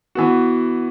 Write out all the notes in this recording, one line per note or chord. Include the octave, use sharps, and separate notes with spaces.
E3 B3 F#4